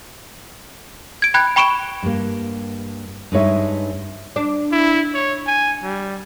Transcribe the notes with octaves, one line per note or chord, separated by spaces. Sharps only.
G#6 D7
G5 B5 F#6 G#6
G5 B5 C#6 D7 E7
G2 A#3
G2 G#3 D#4 C#5 E5
D4
E4
C#5
G#5
G3